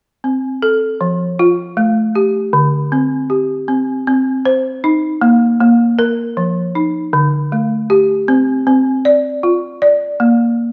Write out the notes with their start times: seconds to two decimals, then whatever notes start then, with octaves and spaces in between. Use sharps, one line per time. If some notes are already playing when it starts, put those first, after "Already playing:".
0.24 C4
0.62 A4
1.01 F3
1.39 F4
1.77 A3
2.15 G4
2.53 D3
2.92 C4
3.30 G4
3.68 C4
4.07 C4
4.46 C5
4.84 D#4
5.21 A#3
5.60 A#3
5.99 A#4
6.37 F3
6.75 D#4
7.13 D3
7.52 A3
7.90 G4
8.28 C4
8.67 C4
9.05 D5
9.43 F4
9.82 D5
10.20 A#3